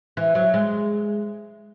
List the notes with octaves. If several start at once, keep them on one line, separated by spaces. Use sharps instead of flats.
E3
F#3
G#3